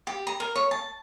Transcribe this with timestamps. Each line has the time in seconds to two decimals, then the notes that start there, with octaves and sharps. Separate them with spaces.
0.07 G4
0.27 A#5
0.40 A#4
0.56 C#5
0.71 A5